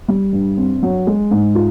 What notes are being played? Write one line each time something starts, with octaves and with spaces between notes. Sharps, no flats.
G3
G2
C4
F#3
G#3
G#2
F4